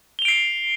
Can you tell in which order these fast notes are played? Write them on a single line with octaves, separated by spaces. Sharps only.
G7 F7 D7 C7